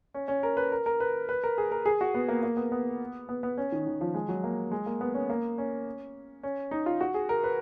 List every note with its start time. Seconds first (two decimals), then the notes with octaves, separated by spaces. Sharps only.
0.14 C#4
0.28 C#4
0.43 A#4
0.57 B4
0.72 A#4
0.86 A#4
1.00 B4
1.29 B4
1.44 A#4
1.58 G#4
1.72 A#4
1.86 G#4
2.01 F#4
2.14 B3
2.28 A#3
2.43 A#3
2.57 B3
2.72 B3
3.29 B3
3.43 B3
3.58 C#4
3.72 D#3
3.87 D#3
4.01 F3
4.14 G#3
4.28 F#3
4.44 A#3
4.72 G#3
4.86 A#3
5.01 B3
5.14 C#4
5.30 A#3
5.58 C#4
6.43 C#4
6.71 D#4
6.86 F4
7.01 F#4
7.14 G#4
7.29 A#4
7.44 B4